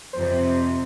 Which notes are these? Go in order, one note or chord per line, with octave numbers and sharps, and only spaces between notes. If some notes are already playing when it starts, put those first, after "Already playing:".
F2 C3 C5